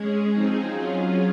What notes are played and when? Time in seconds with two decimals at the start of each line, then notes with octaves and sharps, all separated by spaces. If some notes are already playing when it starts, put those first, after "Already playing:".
Already playing: G#3 C#4 G#4
0.32 F3 C4 D#4 G#4
0.73 F#3 C#4 F4 G#4